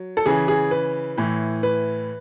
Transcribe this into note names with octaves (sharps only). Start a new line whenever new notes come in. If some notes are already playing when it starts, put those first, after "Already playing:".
Already playing: F#3
A4
C#3 E3 G#4
G#4
B4
A2 E3
B4